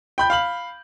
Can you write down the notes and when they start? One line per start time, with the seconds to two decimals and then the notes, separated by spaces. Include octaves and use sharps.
0.18 G5 B5 G6
0.30 F5 B5 F#7